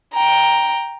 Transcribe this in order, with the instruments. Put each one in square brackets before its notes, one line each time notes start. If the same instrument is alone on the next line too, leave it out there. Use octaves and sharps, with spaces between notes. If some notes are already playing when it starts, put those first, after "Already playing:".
[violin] G5 A#5